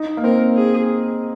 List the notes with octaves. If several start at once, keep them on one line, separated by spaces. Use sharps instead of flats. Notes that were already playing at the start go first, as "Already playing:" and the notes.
Already playing: D#4
A#3
C4 A#4
G#4